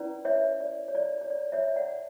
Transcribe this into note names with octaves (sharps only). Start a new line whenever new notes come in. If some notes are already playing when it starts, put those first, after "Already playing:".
Already playing: C#4 E4 B4 D5
C#5 E5
D5
C#5
D5
C#5
D5
C#5 E5
D5 F#5